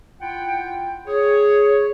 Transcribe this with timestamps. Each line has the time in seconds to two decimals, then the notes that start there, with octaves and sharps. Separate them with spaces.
0.21 E4 F4 F#5 G5
1.06 G#4 C#5